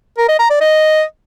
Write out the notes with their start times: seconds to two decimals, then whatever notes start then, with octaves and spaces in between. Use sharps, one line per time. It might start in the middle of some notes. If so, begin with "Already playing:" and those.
0.18 A#4
0.29 D#5
0.39 A#5
0.50 D5
0.61 D#5